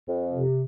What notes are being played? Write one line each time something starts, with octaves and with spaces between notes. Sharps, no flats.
F2
C3